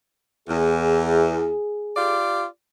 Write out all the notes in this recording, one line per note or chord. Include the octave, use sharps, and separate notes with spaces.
E2 G#4
F4 G4 D5